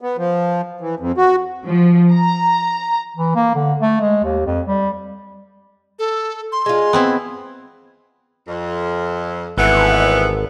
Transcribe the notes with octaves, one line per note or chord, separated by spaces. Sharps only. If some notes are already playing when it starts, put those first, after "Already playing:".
B3
F3
E3
F2
F#4
F3
A#5
E3
A#3
D3
A3
G#3
D#2
F2
G3
A4
C6
G#3 F4
B3 C4 E4
F2
G#1 E3 A3 B3